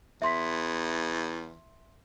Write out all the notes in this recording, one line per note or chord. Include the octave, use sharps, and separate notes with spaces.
E2 E5 C6 B6